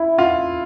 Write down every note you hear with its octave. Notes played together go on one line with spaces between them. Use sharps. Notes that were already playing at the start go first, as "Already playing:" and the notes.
Already playing: E4
F4